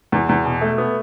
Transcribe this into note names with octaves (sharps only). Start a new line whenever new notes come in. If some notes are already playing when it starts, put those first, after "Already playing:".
E2
E2
B2
A3
B3